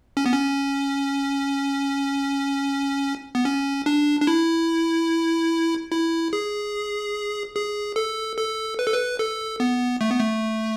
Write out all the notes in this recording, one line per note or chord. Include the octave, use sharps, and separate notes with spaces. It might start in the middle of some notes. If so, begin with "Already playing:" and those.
C#4
B3
C#4
B3
C#4
D4
D4
E4
E4
G#4
G#4
A4
A4
B4
A4
B4
A4
B3
A3
B3
A3